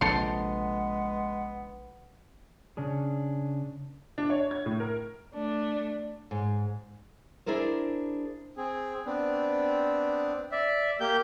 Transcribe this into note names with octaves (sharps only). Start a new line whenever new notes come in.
A#1 C3 G#3 B3 A4 C6
C#3 C#4 D4 G#4
D4
C#5
G#6
A2
A#4
A3 D4
G#2
D4 E4 G#4 A#4 C5
C4 G#4
B3 C4 D4
D5 E5
A#3 G4 G6